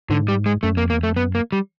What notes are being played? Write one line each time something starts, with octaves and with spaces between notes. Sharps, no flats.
G#2 D3
G3
G#3
F#2 A3
F2 A#3
E2 A#3
F2 A3
F#2 B3
A#3
G3